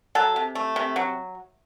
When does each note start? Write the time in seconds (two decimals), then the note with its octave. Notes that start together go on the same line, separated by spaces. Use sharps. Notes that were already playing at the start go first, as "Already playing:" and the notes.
0.15 F#3 A4
0.36 C3
0.55 A3
0.76 C3
0.96 F#3